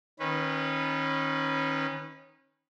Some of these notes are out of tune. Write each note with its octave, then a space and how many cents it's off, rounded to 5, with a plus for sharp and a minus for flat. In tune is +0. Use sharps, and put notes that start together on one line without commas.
D#3 +0 C#4 -30 B4 +0